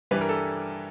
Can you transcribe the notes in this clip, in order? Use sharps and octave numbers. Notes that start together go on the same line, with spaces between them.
G2 E3 G3 B4
A#4
A4